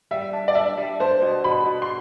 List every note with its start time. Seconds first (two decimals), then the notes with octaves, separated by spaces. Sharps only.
0.11 G3 E5
0.33 D4
0.48 D5
0.55 D4 E5
0.78 G3
1.00 D4 C5
1.22 B2
1.44 B2 B5
1.66 B2
1.82 C6